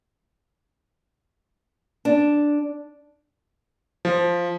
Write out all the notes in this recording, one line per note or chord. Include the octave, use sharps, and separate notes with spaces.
D4
F3